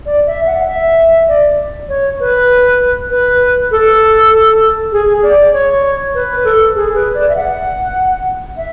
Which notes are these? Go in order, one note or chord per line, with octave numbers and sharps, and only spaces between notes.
D5
E5
F#5
E5
D5
C#5
B4
B4
A4
G#4
D5
C#5
B4
A4
G#4
B4
D5
E5
F#5
E5